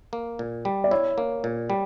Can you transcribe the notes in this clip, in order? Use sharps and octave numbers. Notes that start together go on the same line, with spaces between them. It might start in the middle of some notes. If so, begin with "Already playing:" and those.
A#3
A#2
G3
D5
E4 C#5
A#3
A#2
G3